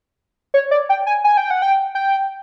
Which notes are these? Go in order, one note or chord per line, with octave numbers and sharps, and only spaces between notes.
C#5
D5
G5
G#5
G#5
G5
F#5
G5
G5